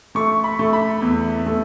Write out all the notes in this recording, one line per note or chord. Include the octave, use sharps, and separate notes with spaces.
A3 C#6
B5
A3
B5
E2
A3